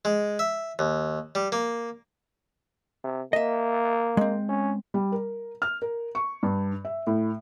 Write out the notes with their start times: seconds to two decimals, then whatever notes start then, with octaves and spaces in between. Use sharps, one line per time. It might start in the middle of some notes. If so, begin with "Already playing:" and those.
0.05 G#3
0.39 E5
0.79 D#2
1.35 G3
1.52 A#3
3.04 C3
3.33 A#3 D#5 E5
4.17 G#3 C4
4.49 C#4
4.94 G3
5.12 A#4
5.62 F6
5.82 A#4
6.15 C#6
6.43 G2
6.85 E5
7.07 A2